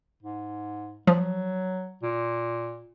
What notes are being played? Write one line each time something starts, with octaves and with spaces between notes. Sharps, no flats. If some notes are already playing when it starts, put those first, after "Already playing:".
G#2
F3 F#3
A#2